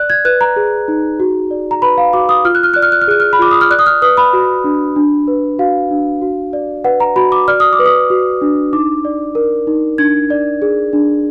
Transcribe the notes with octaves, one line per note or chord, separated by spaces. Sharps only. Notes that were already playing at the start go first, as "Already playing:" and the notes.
Already playing: D5 F#6
G#6
B4 F#6
A#5
G#4
D#4
F#4
D5
A#5
B4 B5
F5
F#4 D6
D#6
F4 F6
F#6
F6
D5 F#6
F6
F#6
F6
G#4 F#6
F6
B5
F4 D6
D#6
F6
D5 F#6
D#6
F6
B4 D#6
B5
F#4
D4
D4
B4
F#4 F5
D4
F#4
D5
B4 F#5
A#5
F#4 B5
D6
D5 F6
D#6
D6
B4
D#6
F#4
D4
D#4 D6
D5
A#4
D#4
D4 G#6
D5
G#4
D4